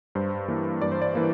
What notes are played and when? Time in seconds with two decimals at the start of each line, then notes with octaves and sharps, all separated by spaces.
0.15 G2 C5
0.48 E3 A#3
0.82 G2 D5
0.92 C5
1.02 D5
1.15 E3 A#3